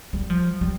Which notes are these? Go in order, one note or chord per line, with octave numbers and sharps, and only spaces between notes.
G3
F3
G3